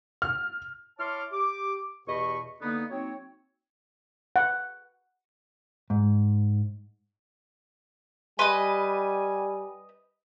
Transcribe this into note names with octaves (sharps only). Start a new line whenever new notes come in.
F6
E4 C#5 A5 C6 D6 F6
G4 D6
E2 B2 G4 D#5 B5 C#6
D3 A#3 B3 D#4
F#3 A#3 C4 D#4 C#5
F#5
G#2
G3 B4 D#5 G#5 C6